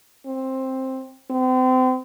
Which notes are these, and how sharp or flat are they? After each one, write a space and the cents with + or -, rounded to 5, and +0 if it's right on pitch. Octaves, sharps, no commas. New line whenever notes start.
C4 +10
C4 -35